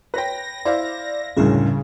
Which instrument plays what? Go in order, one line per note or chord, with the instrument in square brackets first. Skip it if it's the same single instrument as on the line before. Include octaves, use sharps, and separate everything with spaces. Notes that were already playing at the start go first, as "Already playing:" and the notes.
[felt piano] B4 C#5 G5 [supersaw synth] A#6
[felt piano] E4 C5 F5 [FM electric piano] D5
[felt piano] F#1 D2 [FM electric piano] A2 E4 G#4 [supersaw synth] C#3 [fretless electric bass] G3 C#4